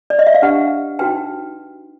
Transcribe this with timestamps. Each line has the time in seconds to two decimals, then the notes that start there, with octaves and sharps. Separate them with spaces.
0.10 D5
0.19 D#5
0.27 E5
0.35 F5
0.42 D4 G4 B4 F#5
0.99 D#4 F#4 B4 G5